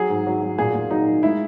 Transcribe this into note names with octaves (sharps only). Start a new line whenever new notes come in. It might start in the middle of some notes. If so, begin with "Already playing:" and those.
Already playing: F#3 G#4
G#2
F#3
F#3
A#2 G#4
A#2
F#3 D#4
F#3
G#3 E4